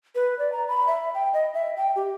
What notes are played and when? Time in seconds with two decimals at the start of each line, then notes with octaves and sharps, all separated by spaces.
0.15 B4
0.39 D5
0.53 A#5
0.68 B5
0.87 E5
1.14 G5
1.34 D#5
1.54 E5
1.77 G5
1.96 G4